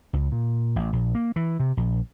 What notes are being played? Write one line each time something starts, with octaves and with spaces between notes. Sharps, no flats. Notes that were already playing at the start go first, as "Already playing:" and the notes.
C#2
A#2
A1
A#1
A#3
E3
C3
A#1